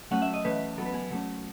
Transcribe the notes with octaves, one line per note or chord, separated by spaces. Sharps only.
F#3 A3 C#4 F#5
E5
D#5
E3 A3 C#4 B4
F#3 B3 A4
B4
G#4
F#3 A3 C#4